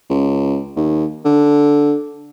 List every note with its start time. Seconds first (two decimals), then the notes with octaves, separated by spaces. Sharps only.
0.10 C#2
0.76 D#2
1.25 D3